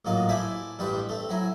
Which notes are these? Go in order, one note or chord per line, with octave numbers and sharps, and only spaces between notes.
A1 G#2 F#3 A#3 F4 D#5
E4 C5 D5 E5 G#5 A5
A1 G2 G3 G4 B4 C6
A3 C4
F#3 E4 G#5 A#5